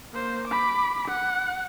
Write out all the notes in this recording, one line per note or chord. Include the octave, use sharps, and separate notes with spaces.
A#3 C5
B5 D6
F#5